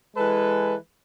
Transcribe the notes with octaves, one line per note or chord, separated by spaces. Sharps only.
E3 G#3 A4 B4